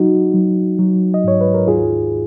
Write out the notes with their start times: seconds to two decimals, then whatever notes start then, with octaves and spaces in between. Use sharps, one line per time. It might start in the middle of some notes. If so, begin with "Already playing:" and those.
Already playing: F#3 D#4 F#4
0.34 F#3
0.79 F#3
1.14 D#5
1.24 G#2 C#5
1.41 B4
1.54 A#4
1.67 D#2 F4 G#4